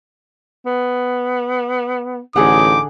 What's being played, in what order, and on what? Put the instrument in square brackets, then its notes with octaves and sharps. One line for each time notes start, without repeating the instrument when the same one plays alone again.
[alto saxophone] B3
[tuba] A1 [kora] D3 G#4 F#5 [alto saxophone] D#4 [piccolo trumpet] D6